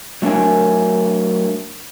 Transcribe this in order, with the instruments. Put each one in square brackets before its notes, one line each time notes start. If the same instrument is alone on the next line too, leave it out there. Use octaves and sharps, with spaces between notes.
[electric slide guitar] F#3 A3 D4 A#4 G#5